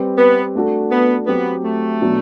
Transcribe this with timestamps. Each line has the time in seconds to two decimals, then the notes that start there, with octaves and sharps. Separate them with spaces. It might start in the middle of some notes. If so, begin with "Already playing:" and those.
Already playing: G3 C4 G4 B4
0.18 B3
0.55 A3 D4 F#4 A4
0.91 B3
1.27 F#3 B3 C4 G4
1.64 A3
2.00 B2 F#3 B3 D4 F#4